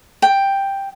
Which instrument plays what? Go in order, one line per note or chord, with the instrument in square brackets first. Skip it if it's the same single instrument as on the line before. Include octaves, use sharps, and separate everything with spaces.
[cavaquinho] G5